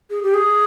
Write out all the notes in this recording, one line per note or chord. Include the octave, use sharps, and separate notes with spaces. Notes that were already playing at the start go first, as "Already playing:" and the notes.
G#4
G4
G#4